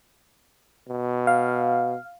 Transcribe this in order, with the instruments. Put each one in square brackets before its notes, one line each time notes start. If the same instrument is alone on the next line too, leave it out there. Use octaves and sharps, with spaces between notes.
[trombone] B2
[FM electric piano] F5